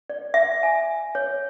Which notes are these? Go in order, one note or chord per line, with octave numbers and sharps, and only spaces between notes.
D5
E5
G#5
C#5